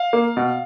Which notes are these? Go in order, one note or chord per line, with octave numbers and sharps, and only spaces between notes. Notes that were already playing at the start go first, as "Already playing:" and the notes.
Already playing: F5
A#3
B2